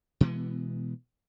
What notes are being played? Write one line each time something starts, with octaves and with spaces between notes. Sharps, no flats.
B2 E3 G#3 B3